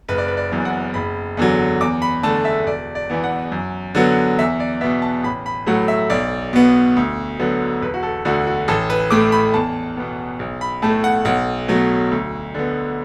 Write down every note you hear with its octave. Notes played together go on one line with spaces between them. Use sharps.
F#1 B4
D5
B4
D5
F#2 E3 B3
F#5
F#1 B5
E2 D3 F#3
E2 D6
B5
D3 A3 A5
E5
E1 D5
D5
E2 E3 B3
F#5
F#2
D3 F#3 B3
E2 E5
D5
B2 B3 E5
A5
A1 B5
B5
A2 F#3 A3 F#5
E5
B1 D5
B2 B3
D2
D3 F#3 B3
E1 B4
F#4
A4
D2 D3 F#4
F#4
A1 A4
B4
A2 A3 D6
B5
E2 A5
B2 B3
B1
B5
A2 A3 A5
F#5
B1 F#5
B2 F#3 A3
D2
D3 B3